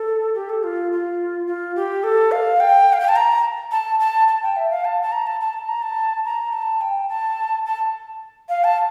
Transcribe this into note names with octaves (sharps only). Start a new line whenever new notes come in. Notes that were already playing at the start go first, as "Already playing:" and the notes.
Already playing: A4
G4
A4
F4
F4
F4
G4
A4
F5
G5
F5
G5
A5
A#5
A5
A5
A5
G5
E5
F5
A5
A5
A#5
A5
A5
A#5
A5
A#5
A5
G5
A5
A5
F5
A5